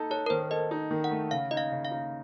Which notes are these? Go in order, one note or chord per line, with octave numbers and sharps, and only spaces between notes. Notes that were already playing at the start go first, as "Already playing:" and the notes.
Already playing: D#4 A4
A4 C#5
A#4
D#3 C5
A4 D#5
D#4
D#3
F#5
A3
C#3 F5
D#4 D#5
F5
C#3
F5
D#4